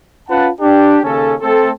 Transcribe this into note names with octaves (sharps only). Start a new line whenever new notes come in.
C#4 F4 B4 F#5 A5
D4 G4
D#2 C#3 C#4 A4
A3 C4 A4